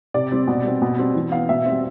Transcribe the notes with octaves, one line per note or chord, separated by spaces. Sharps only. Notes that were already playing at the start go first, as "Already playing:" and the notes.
C3 D5
G3 C4
B2
G3 C4
B2
G3 C4
E3
B3 F5
B2 E5
G3 C4